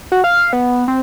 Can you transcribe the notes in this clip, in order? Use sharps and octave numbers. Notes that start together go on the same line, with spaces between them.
F#4
F5
B3
C4